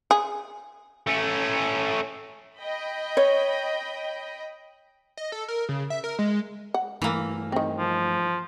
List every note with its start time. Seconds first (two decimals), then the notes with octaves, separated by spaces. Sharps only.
0.11 G#4
1.07 A3 C#4
2.58 D#5 G5 B5
3.17 C#5
5.17 D#5
5.32 A4
5.48 A#4
5.69 C#3
5.90 E5
6.04 A#4
6.19 G#3
6.74 F#5
7.02 G2 E3 A3 A#3
7.52 D#3 C4
7.78 F3